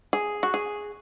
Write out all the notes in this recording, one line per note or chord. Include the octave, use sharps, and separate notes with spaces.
G#4
F#4
G#4